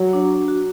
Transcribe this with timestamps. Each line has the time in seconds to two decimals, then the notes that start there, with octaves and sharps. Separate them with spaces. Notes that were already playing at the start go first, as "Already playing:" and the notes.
Already playing: F#3
0.13 D4
0.48 F#4